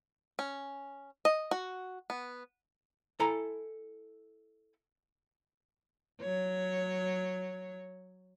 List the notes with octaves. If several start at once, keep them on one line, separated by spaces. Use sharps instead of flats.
C#4
D#5
F#4
B3
E4 A4 G#5 A#5 B5
F#3 C#5